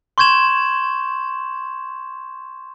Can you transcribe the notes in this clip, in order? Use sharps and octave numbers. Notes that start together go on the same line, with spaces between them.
C6 C#6 G6 G#6 E7 F#7